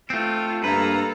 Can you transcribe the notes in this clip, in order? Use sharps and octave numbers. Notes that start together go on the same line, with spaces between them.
A3 C4 F4
G2 A#3 A4 B4 A#5